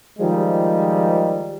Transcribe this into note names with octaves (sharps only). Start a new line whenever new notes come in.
D#3 F3 G3 G#3